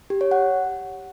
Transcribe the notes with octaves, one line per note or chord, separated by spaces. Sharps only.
G4
C#5
F#5